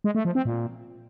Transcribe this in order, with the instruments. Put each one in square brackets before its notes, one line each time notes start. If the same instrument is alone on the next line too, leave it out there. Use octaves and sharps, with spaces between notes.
[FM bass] G#3
A3
F3
C4
A#2